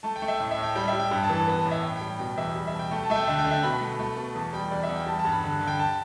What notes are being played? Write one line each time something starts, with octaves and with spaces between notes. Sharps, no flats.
A3 A5
G5
A3
E5
A2
E5
A2
G5
G3 G5
E5
G3
G5
G2
A5
E3
A5
B3 B5
A5
A2
E5
A2 G5
G5
G3
B2 G5
E2 E5
G3
E5
B2
G5
A3
A5
A3 E5
G5
D3 E5
G5
D3
E5
B2 B5
A3
A3
B2
E2 A5
G3 G5
E2 D5
E5
E2
G5
G3 A5
A5
G2
B5
D3
D3
G5
A5